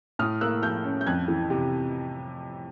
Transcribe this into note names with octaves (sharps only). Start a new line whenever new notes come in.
A2 D#6 F6
A#3 E6 F#6
F3 F6 G6
C#4
G6
F2 F#6 G#6
E3
C3